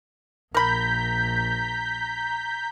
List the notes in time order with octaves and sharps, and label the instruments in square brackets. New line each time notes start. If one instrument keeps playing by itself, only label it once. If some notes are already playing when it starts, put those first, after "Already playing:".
[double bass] A#1 [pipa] A#4 B5 [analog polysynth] A#5 G6 B6